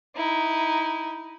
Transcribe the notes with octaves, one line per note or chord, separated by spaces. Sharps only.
D#4 E4